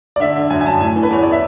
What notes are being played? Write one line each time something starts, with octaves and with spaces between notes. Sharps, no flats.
D5
D3 E5
D3
F#2 G#5
G#5
F#2 A5
A2 G#5
E3
B4
E2 C#5
D5
E5